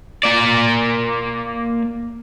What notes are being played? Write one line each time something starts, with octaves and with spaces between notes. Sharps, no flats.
A#3 D5